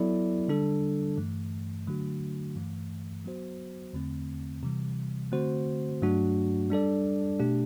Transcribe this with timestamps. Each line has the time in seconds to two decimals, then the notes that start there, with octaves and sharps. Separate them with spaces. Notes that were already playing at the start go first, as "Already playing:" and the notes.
Already playing: F#3 B3 E4 A4 D5
0.48 D3 G3 D4 A4
1.17 G2 E3 A3
1.87 D3 F#3 A3 D4 F#4
2.56 G2 E3 A3
3.24 F#3 B3 F#4 C5
3.93 E2 D3 A3 C4
4.63 C3 E3 G3
5.32 D3 A3 C4 F#4 C5
6.02 G2 F#3 A3 D4 F#4
6.70 G3 D4 A4 D5
7.39 B2 A3 D4 G4